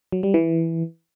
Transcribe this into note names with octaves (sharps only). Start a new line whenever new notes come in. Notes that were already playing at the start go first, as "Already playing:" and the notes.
F#3
G3
E3